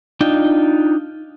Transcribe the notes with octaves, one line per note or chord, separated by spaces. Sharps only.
D4 D#4 F4 G5